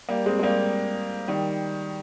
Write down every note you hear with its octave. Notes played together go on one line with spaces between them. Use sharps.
G3 A#3
G#3 C4
G#3
G3 A#3
D#3 G3